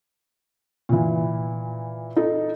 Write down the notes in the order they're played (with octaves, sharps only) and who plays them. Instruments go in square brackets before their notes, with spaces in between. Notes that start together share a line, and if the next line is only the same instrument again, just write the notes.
[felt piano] A#2 E3
D#4 A4